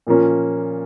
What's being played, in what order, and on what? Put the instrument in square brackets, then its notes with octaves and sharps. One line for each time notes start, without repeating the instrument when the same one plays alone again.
[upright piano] A#2 F3 A#3 C#4